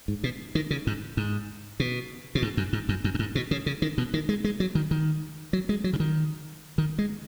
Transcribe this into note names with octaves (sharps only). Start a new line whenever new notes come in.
G#2
B2
D#3
C#3
G#2
G#2
B2
B2
G#2
F#2
G#2
F#2
F#2
F#2
G#2
B2
C#3
C#3
D#3
B2
D#3
G#3
G#3
F#3
D#3
D#3
F#3
G#3
F#3
C#3
D#3
D#3
G#3